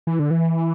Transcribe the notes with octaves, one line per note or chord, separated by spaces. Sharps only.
E3
D3
E3